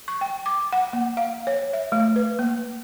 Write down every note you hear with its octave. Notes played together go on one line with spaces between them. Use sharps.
C#6
G5
D6
F#5
A#3
F5
C#5
E5
A3
B4
A#3